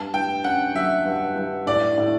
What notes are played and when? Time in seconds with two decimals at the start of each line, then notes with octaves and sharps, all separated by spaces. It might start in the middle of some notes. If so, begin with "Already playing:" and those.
Already playing: G2 A5
0.14 G2 G5
0.44 C#4 F#5
0.75 F#3 E5
1.05 G2
1.36 G2
1.66 A2 D5
1.98 A2